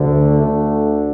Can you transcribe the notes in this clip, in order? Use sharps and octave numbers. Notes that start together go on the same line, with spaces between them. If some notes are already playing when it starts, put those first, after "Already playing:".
Already playing: D2 D3
A3
D2 D3